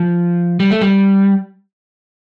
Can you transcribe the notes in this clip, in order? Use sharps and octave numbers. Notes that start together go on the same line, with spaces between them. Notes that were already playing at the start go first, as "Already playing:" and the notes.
Already playing: F3
G3
A3
G3